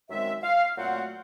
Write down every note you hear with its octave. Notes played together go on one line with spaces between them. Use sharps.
F#2 D#3 G#3 C4 E5
F5
A#2 F#3 A3 C4 F#5